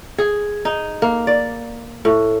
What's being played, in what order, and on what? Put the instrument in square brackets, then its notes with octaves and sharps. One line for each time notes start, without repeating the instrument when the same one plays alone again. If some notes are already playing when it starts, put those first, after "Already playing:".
[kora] G#4
D#4
A#3
D5
A2